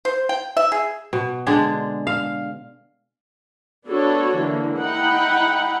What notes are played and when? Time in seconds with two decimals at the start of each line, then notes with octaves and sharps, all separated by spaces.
0.05 C5
0.29 G5
0.57 E5
0.72 G#4
1.13 B2
1.46 D3 G#3 D4 G#4
2.07 F5
3.88 B3 D4 F#4 A4 C#5
4.36 D3 E3 A#3
4.78 D#4 E4 F#5 G5 B5